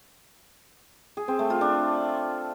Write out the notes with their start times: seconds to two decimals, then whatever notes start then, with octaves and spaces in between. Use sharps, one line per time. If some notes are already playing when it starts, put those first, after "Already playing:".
1.17 G#4
1.28 C4
1.39 A3
1.50 F4
1.61 D4